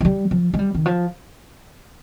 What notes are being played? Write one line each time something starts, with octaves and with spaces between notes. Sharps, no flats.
F3
G3
F3
G#3
G3
D#3
F3